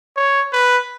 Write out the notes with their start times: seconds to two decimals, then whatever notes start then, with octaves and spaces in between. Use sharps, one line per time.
0.17 C#5
0.53 B4